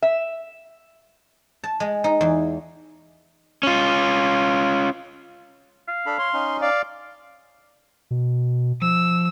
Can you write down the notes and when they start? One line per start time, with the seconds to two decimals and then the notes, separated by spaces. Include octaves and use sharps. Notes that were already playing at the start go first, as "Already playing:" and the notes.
0.02 E5
1.64 A5
1.80 G#3
2.04 D#4
2.21 E2
3.63 C#4 F4
5.88 F5
6.06 D4 A4 B5
6.19 C#5 C6
6.34 C#4 D#4
6.62 D5 F5
8.11 B2
8.81 F3 E6